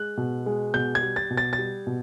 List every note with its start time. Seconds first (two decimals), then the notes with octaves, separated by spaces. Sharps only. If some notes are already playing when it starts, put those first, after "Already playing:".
Already playing: G#3 F#6
0.17 B2
0.46 G#3
0.74 B2 G6
0.95 G#6
1.02 G3
1.16 A6
1.30 B2
1.37 A6
1.53 A6
1.58 G3
1.87 B2